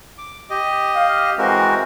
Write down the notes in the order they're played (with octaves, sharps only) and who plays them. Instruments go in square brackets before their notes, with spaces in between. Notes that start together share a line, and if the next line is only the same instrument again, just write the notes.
[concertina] D6
G4 D#5
[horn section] F5
[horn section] E3 C4 [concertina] G#3 F#4 A#4